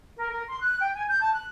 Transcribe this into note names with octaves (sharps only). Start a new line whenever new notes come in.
A#4
A#4
C6
F#6
G5
G#5
G6
A5
F#6